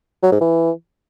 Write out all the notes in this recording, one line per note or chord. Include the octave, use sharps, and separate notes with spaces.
F#3
G#2
E3